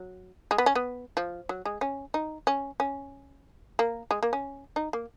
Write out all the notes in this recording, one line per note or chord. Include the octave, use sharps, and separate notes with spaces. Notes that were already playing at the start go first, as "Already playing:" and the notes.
Already playing: F#3
G#3
B3
C#4
B3
F3
F#3
G#3
C#4
D#4
C#4
C#4
A#3
G#3
A#3
C#4
D#4
A#3